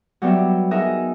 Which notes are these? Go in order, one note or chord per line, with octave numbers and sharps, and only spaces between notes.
F#3 G3 B3 G4 E5
D#4 F#4 G#4 A#4 D#5 E5